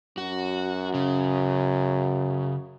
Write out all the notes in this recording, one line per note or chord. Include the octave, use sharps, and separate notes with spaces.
F#2 F#4
C#3